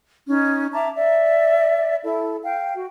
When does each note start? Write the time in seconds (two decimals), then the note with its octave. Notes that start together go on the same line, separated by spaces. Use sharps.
0.28 C#4 D#4
0.73 E5 A5 A#5 D6
0.96 D5 E5
2.05 E4 A4
2.45 F5 G5
2.75 F#4